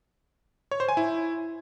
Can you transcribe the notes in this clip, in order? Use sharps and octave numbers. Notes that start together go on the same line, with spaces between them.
C#5
C5
G#5
E4